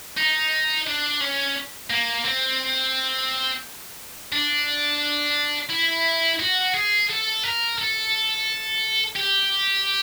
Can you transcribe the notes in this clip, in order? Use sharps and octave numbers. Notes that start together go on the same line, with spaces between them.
D#4
D4
C#4
A#3
C4
D4
E4
F#4
G#4
A4
A#4
A4
G4